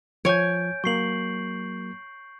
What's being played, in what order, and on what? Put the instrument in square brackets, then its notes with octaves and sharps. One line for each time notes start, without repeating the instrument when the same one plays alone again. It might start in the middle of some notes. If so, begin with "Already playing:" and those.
[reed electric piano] F3 [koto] C#5 G#5 [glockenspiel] G6 D7
[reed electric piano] F#3 A#3 [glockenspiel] C#6 C7 F#7